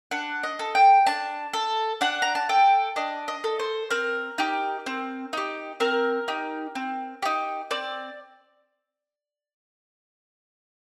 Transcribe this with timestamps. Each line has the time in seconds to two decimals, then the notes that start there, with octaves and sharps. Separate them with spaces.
0.11 D4 F#5
0.43 D#5
0.59 A4
0.75 G5
1.06 D4 A5
1.53 A4
2.01 D4 F#5
2.22 A#5
2.35 A5
2.49 A4 G5
2.96 D4 D#5
3.28 D#5
3.44 A4
3.59 C5
3.90 C4 A#4
4.38 D#4 G4
4.86 C4
5.33 D#4 G4
5.80 C4 A#4
6.28 D#4 G4
6.75 C4
7.22 D#4 G4
7.71 C4 D5